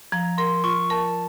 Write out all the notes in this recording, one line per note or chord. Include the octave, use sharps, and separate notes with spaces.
F3 A#5
A#4 C6
F4 C#6
A#4 A5